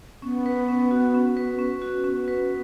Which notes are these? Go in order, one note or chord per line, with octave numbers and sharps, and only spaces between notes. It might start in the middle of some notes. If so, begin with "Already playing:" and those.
B3 C#4
B4
C#4
F#4
C#4
B4
C#4
F#4
B3 C#4
B4